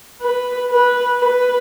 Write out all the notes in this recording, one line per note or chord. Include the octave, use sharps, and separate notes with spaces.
B4
B4
B4